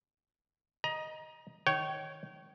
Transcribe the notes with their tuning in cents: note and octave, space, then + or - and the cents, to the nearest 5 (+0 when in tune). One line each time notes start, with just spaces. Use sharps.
D#5 +0 A#5 +25
D#3 +0 C#5 +0 G5 -30